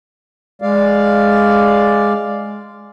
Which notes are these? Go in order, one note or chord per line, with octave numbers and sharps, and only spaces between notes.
G#3 D5 F5